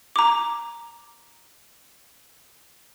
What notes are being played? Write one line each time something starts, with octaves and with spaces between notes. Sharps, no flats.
A#5 D6